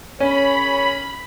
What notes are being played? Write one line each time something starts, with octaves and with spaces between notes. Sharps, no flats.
C#4 G#4 A#4 C#5 B5